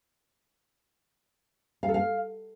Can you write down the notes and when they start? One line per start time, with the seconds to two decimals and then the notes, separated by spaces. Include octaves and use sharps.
1.83 F5
1.88 A4
1.94 F5